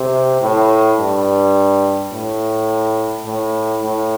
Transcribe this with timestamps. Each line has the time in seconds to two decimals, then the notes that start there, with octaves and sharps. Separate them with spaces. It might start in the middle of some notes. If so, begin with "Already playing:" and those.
Already playing: C3
0.42 A2
0.99 G2
2.12 A2
3.26 A2
3.82 A2